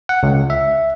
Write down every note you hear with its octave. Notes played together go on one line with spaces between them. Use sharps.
F#5
C#2
E5